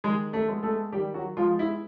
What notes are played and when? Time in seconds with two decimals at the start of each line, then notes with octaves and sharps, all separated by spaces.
0.04 D#3 G#3 G#4
0.33 A3 A4
0.48 G#3 B3
0.63 A3 A4
0.92 D#3 G3 G4
1.14 F#3 F#4
1.37 F3 G#3 B3 F4
1.59 E4